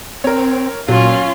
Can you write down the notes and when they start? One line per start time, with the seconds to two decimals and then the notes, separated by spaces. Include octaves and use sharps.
0.24 C4 A#4 C#5
0.88 A#2 F#3 C#4 F4